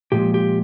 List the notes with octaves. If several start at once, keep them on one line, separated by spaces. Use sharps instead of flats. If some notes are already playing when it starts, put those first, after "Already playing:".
A#2 F3 G#3 G4
G4